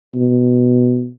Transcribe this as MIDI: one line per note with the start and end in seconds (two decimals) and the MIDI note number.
0.15 1.10 47